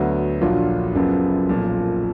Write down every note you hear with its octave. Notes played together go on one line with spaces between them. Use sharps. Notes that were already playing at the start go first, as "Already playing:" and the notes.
Already playing: D2 D3 F#3 B3
A#1 A#2 F#3 D4 F4
F#1 F#2 F3 B3
B1 A#2 F3